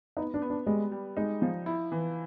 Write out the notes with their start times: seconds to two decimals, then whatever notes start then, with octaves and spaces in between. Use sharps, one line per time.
0.17 B3 D#4
0.34 D4
0.42 B3
0.50 D4
0.67 G3 G#3
0.91 G3
1.17 G#3 D#4
1.42 F3
1.66 E4
1.92 E3